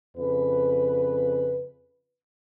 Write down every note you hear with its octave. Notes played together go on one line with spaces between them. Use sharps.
F2 C#3 B4